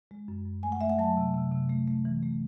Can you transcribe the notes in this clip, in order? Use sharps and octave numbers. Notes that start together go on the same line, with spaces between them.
G#3
F#2
F#2
A3 G#5
F#5
A3 E5
F#5
F#3 A5
C3
C3
C3
A3
A3
E3
A3